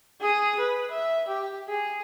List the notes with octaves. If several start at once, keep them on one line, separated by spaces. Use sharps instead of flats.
G#4 D#6
B4
E5
G4
G#4